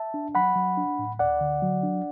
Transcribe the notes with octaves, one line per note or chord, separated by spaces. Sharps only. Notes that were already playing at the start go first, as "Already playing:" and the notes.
Already playing: E5 A5
D4
F#3 F#5 B5
F#3
D4
A2
D2 D5 F#5
D3
F#3
D4